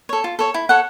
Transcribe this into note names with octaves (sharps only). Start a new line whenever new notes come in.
A4 C#5
F4
A4 C#5
E4
A4 C#5 F#5